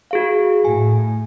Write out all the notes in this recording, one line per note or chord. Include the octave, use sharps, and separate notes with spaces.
F#4 G#4 F5
A2 G#5